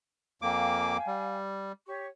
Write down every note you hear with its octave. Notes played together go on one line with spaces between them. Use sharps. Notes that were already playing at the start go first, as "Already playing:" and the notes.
F2 A#3 F5 G5 G#5 D6
G3
G4 C#5 C#6